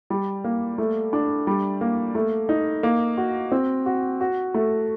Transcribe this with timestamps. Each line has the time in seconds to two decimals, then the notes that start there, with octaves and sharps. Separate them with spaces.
0.10 G3
0.44 A#3
0.78 A3
1.13 D4
1.47 G3
1.81 A#3
2.15 A3
2.49 D#4
2.83 A#3
3.18 F#4
3.52 C4
3.86 F#4
4.21 F#4
4.54 A3